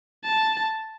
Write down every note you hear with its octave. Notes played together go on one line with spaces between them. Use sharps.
A5